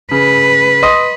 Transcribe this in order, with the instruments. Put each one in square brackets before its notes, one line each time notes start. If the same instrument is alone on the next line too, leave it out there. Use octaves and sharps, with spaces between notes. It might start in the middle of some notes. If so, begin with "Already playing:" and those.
[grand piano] C#3 [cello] B4
[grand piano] D#5 C6 D#6